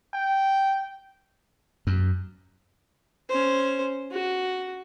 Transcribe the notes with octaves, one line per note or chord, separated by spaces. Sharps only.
G5
F#2
C#4 C5
F#4